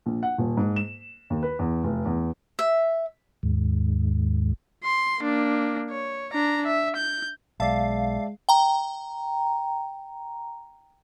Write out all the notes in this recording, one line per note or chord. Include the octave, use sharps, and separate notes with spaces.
A#1
F#5
D#1
G#2
E7
D#2
B4
E2
F1
E2
E5
D#2 G#2
C6
A#3 D4
C#5
D4 A#5
E5
G6
B1 G#3 D5 E5 F5 A5
G5 A#5